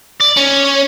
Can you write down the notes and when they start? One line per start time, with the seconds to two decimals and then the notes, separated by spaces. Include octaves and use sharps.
0.21 D5
0.37 C#4